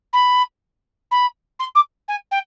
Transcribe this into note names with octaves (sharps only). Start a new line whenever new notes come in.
B5
B5
C6
D6
G#5
G5